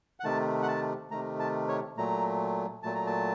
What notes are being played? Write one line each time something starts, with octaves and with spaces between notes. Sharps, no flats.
F#5
C3 D#3 A3 A5
F#5
A5
C3 D#3 A3 A#5
A5
C#5
A#2 F#3 A3 A#5
A#2 F#3 A3 A5
A#5
A5